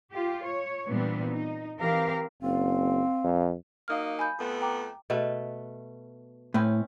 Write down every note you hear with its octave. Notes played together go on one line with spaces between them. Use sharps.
F4 G4
C#5
A#2 E3 G3 B3 C4 D4
D#4
E3 C4 G4 A#4 F5
F#1 C4 F5
F2
F#3 A#3 D#4 F5 D#6 F6
G#5 B5 G6
F2 A3 B3
G5 A#5 D6
B2 A3 B4
A2 C4 C#4 B4